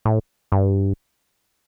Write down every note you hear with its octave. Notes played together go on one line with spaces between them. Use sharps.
A2
G2